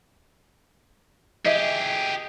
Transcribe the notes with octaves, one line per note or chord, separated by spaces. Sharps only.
G4 G#4 D#5 E5